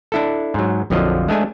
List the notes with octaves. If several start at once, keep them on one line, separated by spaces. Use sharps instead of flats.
D4 E4 A4
G#2 F#3
A#1 F2 D3 F3 F#3 D#5
G#3 A3 D4 G#5